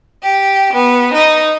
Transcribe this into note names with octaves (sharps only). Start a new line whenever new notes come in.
G4
B3
D#4